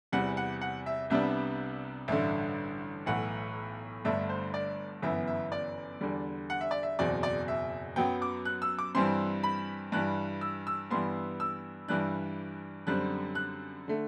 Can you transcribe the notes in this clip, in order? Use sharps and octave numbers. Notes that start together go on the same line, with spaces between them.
E2 C3 E3 G3 F#5
F#5
F#5
E5
C2 C3 G3 B3 D4 E5
A1 G2 D3 E5
B1 A2 E3 F#5
G1 G2 D3 A3 D4 E5
C5
D5
G1 F#2 E3 B3 E5
E5
D5
E2 D3 G3
F#5
E5
D5
E5
F#1 E2 B2 F#3 C4 D5
D5
E5
F#2 F#3 B3 G5
D6
F#6
E6
D6
G2 E3 G3 C4 C6
B5
G2 E3 G3 F#6
E6
E6
G2 E3 G3 B3 C6
E6
G2 E3 G3 D4 F#6
F#2 D3 G3 C4 F#6
F#6
D3 A3